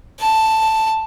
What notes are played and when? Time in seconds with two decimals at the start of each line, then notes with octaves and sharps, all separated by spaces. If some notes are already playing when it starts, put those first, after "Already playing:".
0.20 A5